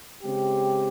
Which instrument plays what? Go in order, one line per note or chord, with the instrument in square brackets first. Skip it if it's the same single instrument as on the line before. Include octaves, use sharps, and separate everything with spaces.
[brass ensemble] C#3 G#3 C4 G4